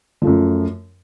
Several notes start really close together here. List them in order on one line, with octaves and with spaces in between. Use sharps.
F3 A3 F#2